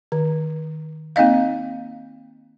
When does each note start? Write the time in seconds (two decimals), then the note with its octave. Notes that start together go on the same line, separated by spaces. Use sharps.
0.12 D#3
1.16 A#3 C4 D#4 D#5 F5